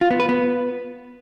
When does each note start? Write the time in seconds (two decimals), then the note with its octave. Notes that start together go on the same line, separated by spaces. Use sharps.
0.01 F4
0.10 B3
0.20 B4
0.29 B3